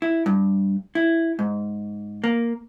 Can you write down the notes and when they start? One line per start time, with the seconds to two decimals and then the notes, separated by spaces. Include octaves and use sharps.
0.02 E4
0.26 G2
0.95 E4
1.39 G#2
2.24 A#3